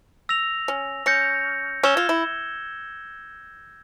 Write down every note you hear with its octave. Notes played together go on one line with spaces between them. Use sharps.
E6 A#6 F7
C#4
C#4 G6 A#6 C#7
C#4 E6 G#6 E7 G7
F4
E4